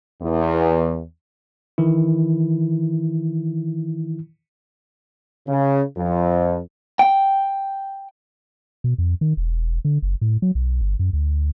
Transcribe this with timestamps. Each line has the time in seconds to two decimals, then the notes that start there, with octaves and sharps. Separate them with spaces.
0.22 E2
1.78 D#3 E3 E4
5.48 C#3
5.97 F2
6.99 G5
8.84 B2
8.98 F2
9.21 D#3
9.37 E1
9.85 D3
10.02 F#1
10.21 A2
10.42 F#3
10.55 B1
10.81 G1
10.99 F#2
11.13 D2